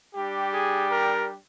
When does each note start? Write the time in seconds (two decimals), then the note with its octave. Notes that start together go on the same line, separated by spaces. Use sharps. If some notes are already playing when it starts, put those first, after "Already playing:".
0.15 G3 D4 G4
0.53 G#4
0.92 A#4